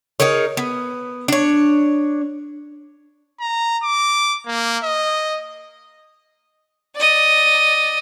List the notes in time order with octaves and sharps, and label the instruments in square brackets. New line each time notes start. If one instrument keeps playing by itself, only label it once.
[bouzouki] D#4 G#4 A#4 C#5
B3
D4 C#5
[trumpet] A#5
D6
A#3
D#5
[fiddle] D5 D#5